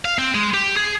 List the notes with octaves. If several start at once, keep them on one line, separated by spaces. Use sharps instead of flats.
F5
C4
G#3
G4
G#4